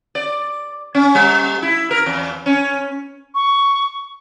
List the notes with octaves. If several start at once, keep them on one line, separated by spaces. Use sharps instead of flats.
D5
C#4
G3
E4
A#4
E2
C#4
C#6